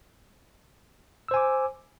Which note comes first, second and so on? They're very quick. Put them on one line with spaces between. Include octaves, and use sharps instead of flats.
E6 C5 G#5 D6